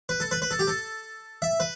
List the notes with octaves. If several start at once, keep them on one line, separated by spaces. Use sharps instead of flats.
B4
A4
B4
B4
A4
G4
A4
E5
B4